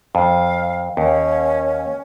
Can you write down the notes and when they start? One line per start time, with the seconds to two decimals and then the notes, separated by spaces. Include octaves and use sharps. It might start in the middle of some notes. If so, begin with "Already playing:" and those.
0.15 F2 F5
0.97 D#2 C#4